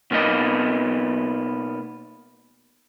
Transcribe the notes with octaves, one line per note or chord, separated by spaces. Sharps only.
B2 A#3 B3 D#4 D#5